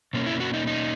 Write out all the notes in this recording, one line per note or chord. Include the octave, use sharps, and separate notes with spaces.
B2 A#3 C#4
E4
F#4
D#4
D#4